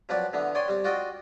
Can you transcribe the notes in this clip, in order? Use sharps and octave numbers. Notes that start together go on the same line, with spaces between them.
F3 F#3 C4 B4 D5
D3 E3 B3
C#5 D5 G5 G#5 C6
G3 C4
F4 F#4 D5 D#5 G5